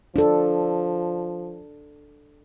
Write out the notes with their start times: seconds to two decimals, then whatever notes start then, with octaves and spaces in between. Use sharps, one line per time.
0.16 F3 D4 A4